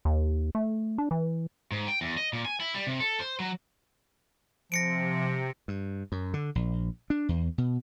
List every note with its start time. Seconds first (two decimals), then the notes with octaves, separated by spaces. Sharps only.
0.05 D#2
0.55 A3
0.98 D4
1.11 E3
1.72 G#2
1.88 G5
2.01 E2
2.17 D#5
2.33 A#2
2.45 G#5
2.60 E4
2.75 G3
2.87 C3
3.00 A4
3.19 C5
3.40 F#3
4.72 C3 F3 A#6 C#7 D7
5.68 G2
6.12 F#2
6.34 D3
6.55 A#1
7.10 D4
7.29 E2
7.58 B2